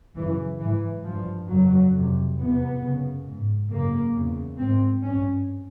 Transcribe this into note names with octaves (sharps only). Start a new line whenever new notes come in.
F#2 C#3 E3
G#2 E3
G2 F3
F2 C#3 F#3
F2 C3
E2 C3 B3
F#2 C#3
G#2
F#2 C#3 A#3
E2 C#3
G#2 C4
G2 C#4